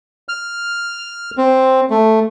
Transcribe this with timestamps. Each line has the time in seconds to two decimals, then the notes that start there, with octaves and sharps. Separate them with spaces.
0.29 F6
1.38 C4
1.90 A3